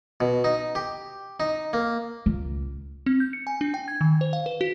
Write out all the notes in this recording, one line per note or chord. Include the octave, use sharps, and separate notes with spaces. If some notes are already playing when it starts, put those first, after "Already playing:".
B2
D#4
G4
D#4
A#3
C#2
C4
G6
C#7
G#5
D4
G5
G#6
D#3
C5
F5
B4
F#4